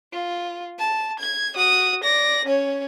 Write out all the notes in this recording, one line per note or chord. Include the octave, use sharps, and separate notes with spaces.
F4
A5
G#6
F#4 D#6
D5 A#6
C#4 C#5